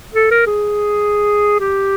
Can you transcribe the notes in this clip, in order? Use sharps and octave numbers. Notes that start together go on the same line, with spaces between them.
A4
A#4
G#4
G4